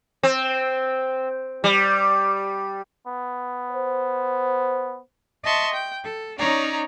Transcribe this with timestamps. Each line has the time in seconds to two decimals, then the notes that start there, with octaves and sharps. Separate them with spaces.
0.23 C4
1.64 G3
3.07 B3
3.72 C5
5.44 D#5 E5 A5 C6 C#6
5.73 G5
6.05 A4
6.38 C#4 D#4 C#5 D5 A#5